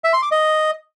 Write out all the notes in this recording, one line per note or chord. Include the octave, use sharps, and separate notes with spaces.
E5
C6
D6
D#5